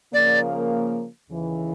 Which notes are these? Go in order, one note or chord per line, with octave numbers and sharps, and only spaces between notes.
C#3 F3 A#3 D5
D#2 C#3 E3